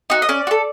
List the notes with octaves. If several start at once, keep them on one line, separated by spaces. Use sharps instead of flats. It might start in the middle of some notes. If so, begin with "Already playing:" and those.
D#4 F#4
D#5
C#4 D5
F#4
A4